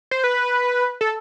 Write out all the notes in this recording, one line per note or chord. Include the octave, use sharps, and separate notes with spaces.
C5
B4
A4